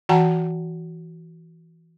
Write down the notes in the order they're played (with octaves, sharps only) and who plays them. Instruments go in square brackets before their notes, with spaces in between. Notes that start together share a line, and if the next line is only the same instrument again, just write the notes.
[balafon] E3 F#4 F#5 G5 A5 A#5